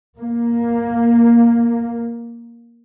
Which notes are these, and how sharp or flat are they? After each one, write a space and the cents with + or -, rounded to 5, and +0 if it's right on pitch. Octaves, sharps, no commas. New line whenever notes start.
A#3 +10